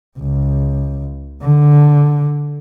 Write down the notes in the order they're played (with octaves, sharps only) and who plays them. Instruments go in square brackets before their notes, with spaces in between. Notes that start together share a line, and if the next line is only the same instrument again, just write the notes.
[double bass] C#2
D3